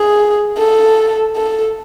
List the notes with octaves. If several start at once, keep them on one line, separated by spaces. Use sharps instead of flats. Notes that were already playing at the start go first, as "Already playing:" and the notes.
Already playing: G#4
A4
A4